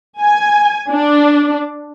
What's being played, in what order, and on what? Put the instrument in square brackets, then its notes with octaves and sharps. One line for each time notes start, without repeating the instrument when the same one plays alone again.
[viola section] G#5
D4